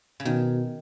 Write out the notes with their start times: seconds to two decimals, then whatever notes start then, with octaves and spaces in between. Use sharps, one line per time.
0.20 C#3
0.25 B2 D#3